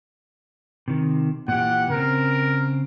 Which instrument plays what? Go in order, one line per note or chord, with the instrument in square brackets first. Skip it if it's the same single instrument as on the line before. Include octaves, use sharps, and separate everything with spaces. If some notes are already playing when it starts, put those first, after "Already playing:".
[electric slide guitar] C3 D#3
[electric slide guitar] A#2 E3 G4 [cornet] F#5
[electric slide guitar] C#3 C4 [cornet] A#4